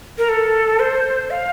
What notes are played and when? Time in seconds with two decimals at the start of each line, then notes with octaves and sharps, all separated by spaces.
0.18 A#4
0.29 A4
0.80 C5
1.30 F5